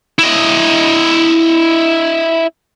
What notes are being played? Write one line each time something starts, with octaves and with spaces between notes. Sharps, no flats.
E4 D#5